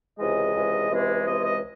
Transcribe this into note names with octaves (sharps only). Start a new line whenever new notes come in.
C#2 C3 E3 G#3 D#5
C#2 C3 E3 G#3
C#2 C3 E3 G#3
C#2 C3 E3 G#3 D#5
D#5